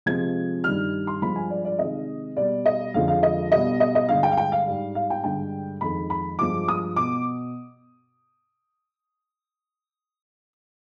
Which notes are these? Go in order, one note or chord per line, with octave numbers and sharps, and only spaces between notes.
C3 F3 G#3 G#6
G2 D#3 G3 F6
C6
G2 F3 G#3 B5
G#5
D5
D5
C3 D#3 G#3 D#5
B2 G3 D5
D#5
F2 D3 F3 G#3 F5
F5
D#5
B2 G3 D#5
D#5
D#5
G2 D3 G#3 F5
G5
F5
G5
F5
G#2 G3
F5
G5
G2 D3 G#3 G5
F2 D#3 G#3 B5
B5
G2 F3 G#3 D6
D#6
B2 D6